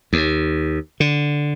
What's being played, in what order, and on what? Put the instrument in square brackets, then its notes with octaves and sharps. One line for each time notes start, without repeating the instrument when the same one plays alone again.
[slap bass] D#2
D3